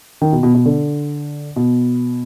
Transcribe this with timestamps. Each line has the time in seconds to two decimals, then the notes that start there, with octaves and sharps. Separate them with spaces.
0.22 D#3
0.32 B2
0.43 B2
0.54 B2
0.66 D3
1.56 B2